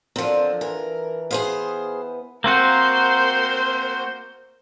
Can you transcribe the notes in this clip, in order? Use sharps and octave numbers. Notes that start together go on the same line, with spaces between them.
D3 F3 C4 F4 A#4
E3 A#4
B3 G#4 B4 C5 F5
A#3 C4 F#4 A#4 C5